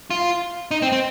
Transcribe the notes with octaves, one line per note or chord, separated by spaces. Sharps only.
F4
D#4
C4
C4